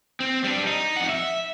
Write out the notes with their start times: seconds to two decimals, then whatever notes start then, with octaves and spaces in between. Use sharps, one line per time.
0.20 C4
0.44 G3 D4
0.67 D#4
0.96 F2 F#5
1.09 E5